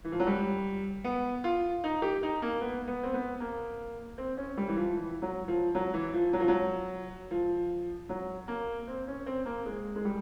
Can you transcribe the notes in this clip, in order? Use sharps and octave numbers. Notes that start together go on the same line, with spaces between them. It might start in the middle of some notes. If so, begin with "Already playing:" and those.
E3
F3
F#3
G3
B3
F4
D#4
G4
D#4
A#3
B3
B3
C4
B3
A#3
C4
C#4
G3
E3
F3
E3
F#3
F3
F#3
E3
F3
F#3
F3
F#3
F3
F#3
A#3
C4
C#4
C4
A#3
G#3
G#3
G3